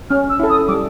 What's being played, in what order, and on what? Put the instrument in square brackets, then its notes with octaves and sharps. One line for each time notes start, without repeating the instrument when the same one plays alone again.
[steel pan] C#4 [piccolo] F6
[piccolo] E6
[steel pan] E4 A4
[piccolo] D#6
[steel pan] G3 [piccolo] D6